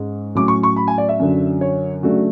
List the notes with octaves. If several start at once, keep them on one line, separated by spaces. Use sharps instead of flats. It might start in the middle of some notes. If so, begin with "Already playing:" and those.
Already playing: G#2 G#3 C#4
A2 F#3 C#4 D6
C#6
C#6
B5
G#5
D5
E5
F#2 D3 F#3
C#5
C#3 F#3 A3 D4 F#4